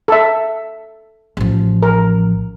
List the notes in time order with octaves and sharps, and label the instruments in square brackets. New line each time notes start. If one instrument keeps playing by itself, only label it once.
[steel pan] A4 E5
[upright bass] A1 F3
[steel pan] A#4